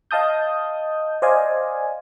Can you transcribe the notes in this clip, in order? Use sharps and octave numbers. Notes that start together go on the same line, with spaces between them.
D#5 F5 A5 D#6 G6
C5 D5 D#5 F5 G#5